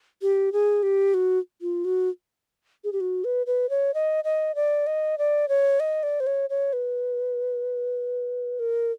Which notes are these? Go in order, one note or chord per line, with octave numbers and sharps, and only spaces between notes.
G4
G#4
G4
F#4
F4
F#4
G#4
G4
F#4
B4
B4
C#5
D#5
D#5
D5
D#5
D5
C#5
D#5
D5
C5
C#5
C#5
B4
A#4